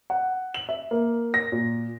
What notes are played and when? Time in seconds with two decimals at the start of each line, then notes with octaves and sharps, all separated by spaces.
0.10 F#5
0.54 F#7
0.69 E5
0.91 A#3
1.34 A#6
1.52 A#2